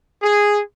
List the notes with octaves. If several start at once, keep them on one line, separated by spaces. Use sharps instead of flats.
G#4